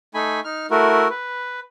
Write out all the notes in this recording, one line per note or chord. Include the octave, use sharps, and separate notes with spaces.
A3 D#4 G#5 B5
D#4 F6
A3 E4 F#4 A#4
B4